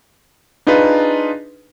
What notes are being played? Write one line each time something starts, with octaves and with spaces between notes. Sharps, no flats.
D4 D#4 F4 G#4 B4